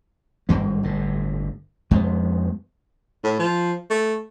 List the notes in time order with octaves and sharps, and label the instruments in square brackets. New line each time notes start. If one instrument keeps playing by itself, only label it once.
[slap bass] G#1 G2 B2 A#3
G1 A2
F2 G#3 A#3 B3
[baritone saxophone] A2
F3
A3